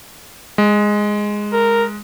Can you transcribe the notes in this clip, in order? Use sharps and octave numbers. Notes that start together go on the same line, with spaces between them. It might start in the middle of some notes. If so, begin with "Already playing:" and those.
G#3
A#4